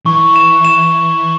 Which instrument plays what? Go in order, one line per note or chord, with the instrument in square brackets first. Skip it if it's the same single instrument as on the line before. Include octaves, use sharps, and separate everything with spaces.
[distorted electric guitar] E3 [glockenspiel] C#6
[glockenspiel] E7
E7